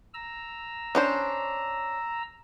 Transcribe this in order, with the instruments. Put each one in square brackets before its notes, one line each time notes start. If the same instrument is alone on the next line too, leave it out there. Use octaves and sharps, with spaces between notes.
[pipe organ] A#5 E6
[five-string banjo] C#4 D4 C5